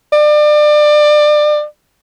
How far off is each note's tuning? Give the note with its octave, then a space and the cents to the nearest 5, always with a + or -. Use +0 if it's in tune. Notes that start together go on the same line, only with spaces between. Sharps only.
D5 +30